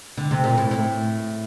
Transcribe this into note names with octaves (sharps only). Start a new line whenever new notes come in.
D3
C3
A#2
A2
A2